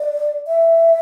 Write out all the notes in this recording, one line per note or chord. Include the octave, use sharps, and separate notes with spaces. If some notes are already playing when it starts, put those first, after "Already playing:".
Already playing: D5
E5